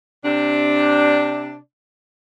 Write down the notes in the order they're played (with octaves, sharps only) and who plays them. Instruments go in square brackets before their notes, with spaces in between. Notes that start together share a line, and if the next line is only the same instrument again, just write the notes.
[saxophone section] C3 D4